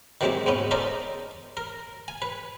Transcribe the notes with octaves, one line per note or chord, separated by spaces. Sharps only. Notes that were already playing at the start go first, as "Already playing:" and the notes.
D#3 E3 F#3 G#3 C4 G4
E2 G#2 B3 C#4
C#4 D#4 A4 A#4 C5 D5
A#4
G#5
B4